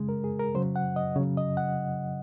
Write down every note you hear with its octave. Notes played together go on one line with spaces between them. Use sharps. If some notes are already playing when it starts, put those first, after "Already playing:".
Already playing: C#3 G#3
A#4
G#4
A#4
C#3 F#3 C5
F#5
D#5
C#3 F#3 C#5
D#5
F#5